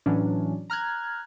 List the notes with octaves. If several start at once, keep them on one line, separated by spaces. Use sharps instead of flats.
A2 E3 F#3 C#4 D4
A#5 F6 F#6 G#6